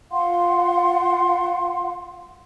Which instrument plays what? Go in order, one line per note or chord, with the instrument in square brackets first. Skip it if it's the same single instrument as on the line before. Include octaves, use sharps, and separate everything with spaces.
[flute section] F4 F5 F#5 C6